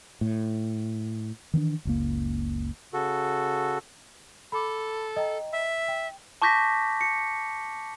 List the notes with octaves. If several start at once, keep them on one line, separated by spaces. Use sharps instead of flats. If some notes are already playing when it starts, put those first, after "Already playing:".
A2
D#3 E3 B3 D4
F#1 C#2 A#3
C#3 F#4 A4
A4 B5 D6
D#5 G5 A#5
E5
G5
A5 C#6 D6 G6 A#6 B6
C#7